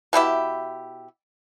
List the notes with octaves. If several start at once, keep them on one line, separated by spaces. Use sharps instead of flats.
B2 E4 G4 E5